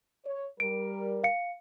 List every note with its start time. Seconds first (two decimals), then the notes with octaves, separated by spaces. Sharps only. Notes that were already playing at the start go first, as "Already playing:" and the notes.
0.25 C#5
0.60 G3 A#4 D7
1.24 F5 C#7